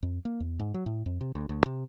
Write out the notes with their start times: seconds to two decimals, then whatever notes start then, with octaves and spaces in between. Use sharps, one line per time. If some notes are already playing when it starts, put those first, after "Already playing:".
0.03 F2
0.25 A#3
0.40 E2
0.59 G#2
0.74 F#3
0.86 A2
1.06 F2
1.21 C3
1.35 D2
1.49 D2
1.66 C3